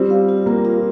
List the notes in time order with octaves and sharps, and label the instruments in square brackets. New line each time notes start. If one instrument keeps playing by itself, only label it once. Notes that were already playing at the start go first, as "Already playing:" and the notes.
Already playing: [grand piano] G3 C4 [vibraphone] F4
[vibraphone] F5
F4
[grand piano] A#3 [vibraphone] A#4
[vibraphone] F4